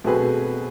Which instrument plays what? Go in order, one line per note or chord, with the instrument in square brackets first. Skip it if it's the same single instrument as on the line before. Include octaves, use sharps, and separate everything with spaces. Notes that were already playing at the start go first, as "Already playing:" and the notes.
[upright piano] B2 A3 C4 G#4 B4